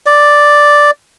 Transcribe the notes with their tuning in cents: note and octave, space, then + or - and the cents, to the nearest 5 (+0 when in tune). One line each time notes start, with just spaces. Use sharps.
D5 +0